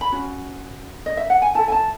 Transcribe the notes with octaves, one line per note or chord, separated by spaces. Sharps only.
B5
C#4 F#4
D#5
E5
F#5
G#5
E4 A4 A5
G#5
A5